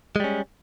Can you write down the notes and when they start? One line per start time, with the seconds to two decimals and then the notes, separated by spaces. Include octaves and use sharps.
0.16 G#3
0.20 G3
0.24 C#4